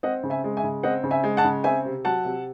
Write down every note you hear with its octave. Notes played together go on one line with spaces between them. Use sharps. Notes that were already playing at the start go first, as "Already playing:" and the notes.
C4 D#5 F#5
C#3
E5 G#5
G#3
E5 G#5
C#3
C4 D#5 F#5
C#3
E5 G#5
G#3
F#5 A5
C#3
C4 E5 G#5
C3
F#3 F#5 A5
C3